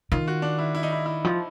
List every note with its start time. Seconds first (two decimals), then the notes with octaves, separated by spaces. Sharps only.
0.12 D#3 F4
0.28 F#4
0.42 D4
0.59 E4
0.75 E4
0.83 D#4
0.92 E4
1.06 E4
1.24 F3